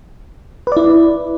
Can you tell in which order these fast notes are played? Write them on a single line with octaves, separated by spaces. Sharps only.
B4 D5 E4